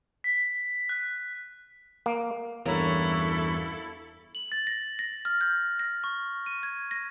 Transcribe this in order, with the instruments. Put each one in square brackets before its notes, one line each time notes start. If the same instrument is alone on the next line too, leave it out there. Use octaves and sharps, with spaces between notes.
[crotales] B6
F#6
[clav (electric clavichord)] A#3
[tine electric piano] E2 G2 [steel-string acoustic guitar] A#3 C#4 F#4 [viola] E4 A4
[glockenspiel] F#7
A6
A#6
A#6
F6
G6
A#6
C#6
D#7
G#6
A#6